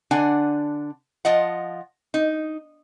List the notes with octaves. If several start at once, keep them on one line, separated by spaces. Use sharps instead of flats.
D3 D4 D5 F#5 G#5
F3 F4 D#5 F#5
D#4